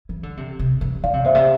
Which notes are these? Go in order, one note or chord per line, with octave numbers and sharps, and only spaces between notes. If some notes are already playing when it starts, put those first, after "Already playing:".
E3
D3
C3
C3
E3
D3 D5 F5
C3
A#2 C5 E5
C3